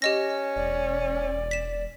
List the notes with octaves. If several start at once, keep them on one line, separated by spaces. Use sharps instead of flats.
C#4 G4 D#5 A#6
E1 D5
B6 E7